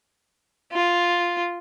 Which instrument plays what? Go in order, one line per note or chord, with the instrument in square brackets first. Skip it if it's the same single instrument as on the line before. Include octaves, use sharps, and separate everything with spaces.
[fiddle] F4